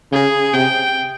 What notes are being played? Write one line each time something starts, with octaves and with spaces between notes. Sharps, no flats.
C#3 G#4
C3 G5